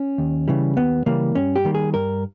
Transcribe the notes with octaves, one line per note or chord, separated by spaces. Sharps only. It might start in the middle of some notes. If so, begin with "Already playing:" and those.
Already playing: C#4
D#2
C#3 E3 G3
D#2 B3
C#3 E3 G3 A#3
G2 C#4
G4
D#3 G3 A#3
G#4
G2 A#4